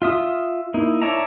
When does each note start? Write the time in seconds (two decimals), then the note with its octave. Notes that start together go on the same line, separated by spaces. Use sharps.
0.02 F4 E5 D#6
0.74 A#3 D#4 E4
1.02 C#5 D5 E5 A5 A#5